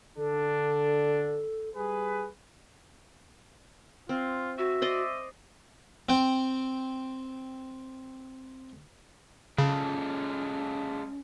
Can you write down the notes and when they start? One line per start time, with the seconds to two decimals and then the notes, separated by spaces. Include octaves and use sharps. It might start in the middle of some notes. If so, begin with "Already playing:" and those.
0.16 D3 D4 A4
1.75 G3 G#4 B4
4.09 C4 F4
4.58 F#4 E5
4.82 C5 D5 D#5
6.09 C4 G5
9.58 C#3 G#3 C#4 F4 A4